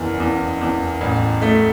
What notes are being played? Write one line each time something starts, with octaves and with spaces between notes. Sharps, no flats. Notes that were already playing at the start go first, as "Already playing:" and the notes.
Already playing: F#1 E2
E2
E2
A1
A3